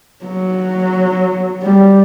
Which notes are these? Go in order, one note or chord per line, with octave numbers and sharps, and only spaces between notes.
F#3
G3